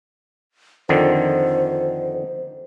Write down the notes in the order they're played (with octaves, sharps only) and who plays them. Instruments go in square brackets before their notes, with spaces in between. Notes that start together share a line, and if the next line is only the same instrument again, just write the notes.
[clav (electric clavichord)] F2 D3 D#3 [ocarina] C5